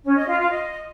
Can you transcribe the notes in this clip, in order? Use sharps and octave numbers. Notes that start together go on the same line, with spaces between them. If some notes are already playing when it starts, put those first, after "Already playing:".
C#4
D#5
F4
F4
D#5